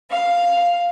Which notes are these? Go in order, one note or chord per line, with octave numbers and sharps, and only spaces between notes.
F5